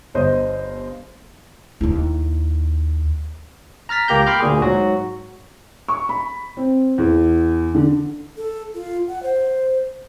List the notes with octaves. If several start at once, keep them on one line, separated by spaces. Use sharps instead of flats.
G1 C5 D#5
D#2 E4
A#5 F6 A6 B6
C#2 A#3 G4 A#5 G6
G5 B5 C6 D6 F6 G6
D2 A#2 G#4
G#2 F#3 F#4
C#6
B5
C4
E2
D3
A4
F4
F#5
C5